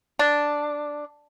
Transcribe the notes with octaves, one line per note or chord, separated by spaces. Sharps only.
D4